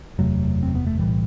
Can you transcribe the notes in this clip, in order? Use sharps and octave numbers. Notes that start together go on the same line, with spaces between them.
F#1 E2 C3 F#3 A3
C4
B3
A3
B1 A2 E3 G3